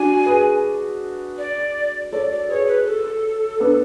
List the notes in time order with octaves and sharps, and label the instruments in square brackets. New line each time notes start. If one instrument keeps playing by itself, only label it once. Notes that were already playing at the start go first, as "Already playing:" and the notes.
Already playing: [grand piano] D4 F#4 [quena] G#5
[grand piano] G#4 B4
[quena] D5
[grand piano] A4 C#5 [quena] D5
[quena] D5
[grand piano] G#4 B4 [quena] C#5
[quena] B4
A4
[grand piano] B3 D4